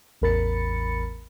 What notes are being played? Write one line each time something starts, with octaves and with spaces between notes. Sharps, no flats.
A1 E2 A#4 B5 A6 C#7